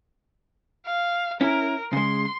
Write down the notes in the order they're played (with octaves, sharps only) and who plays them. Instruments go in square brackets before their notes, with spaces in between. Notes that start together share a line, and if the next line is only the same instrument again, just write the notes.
[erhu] F5
[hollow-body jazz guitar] C#4 E4 [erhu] A#4
[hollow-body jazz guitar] C#3 G#3 [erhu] C6